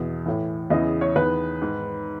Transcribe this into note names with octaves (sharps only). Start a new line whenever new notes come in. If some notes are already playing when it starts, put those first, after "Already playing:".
Already playing: E2 B2
A2 E3
E2 C#3 E3 D#5
C#5
E2 D#3 B4
G#2 D#3